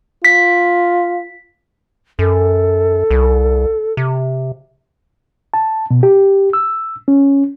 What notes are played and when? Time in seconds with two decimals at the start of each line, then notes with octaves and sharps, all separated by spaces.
0.25 F4 B6
2.19 F#2 A4
3.11 C2
3.97 C3
5.54 A5
5.91 B2
6.03 G4
6.53 E6
7.08 C#4